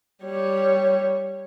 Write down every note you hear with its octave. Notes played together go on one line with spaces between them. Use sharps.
G3 C#5